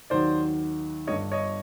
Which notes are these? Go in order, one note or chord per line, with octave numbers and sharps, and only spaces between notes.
D#2 D#3 F#3 C5 D5
G1 G2 D3 C#5 D#5
C#5 D#5